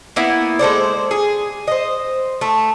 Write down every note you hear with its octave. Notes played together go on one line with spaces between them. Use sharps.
A#3 B3 E4
G#3 A4 C5 D5
G#4
C5 D#5
A3